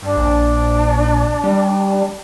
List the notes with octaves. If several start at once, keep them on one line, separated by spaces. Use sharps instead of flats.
G2 D4
A#1
G3